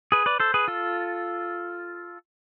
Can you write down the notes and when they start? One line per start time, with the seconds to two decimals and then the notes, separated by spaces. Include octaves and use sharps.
0.12 G#4 B4
0.26 B4 D5
0.40 A4 C5
0.54 G#4 B4
0.68 F4 A4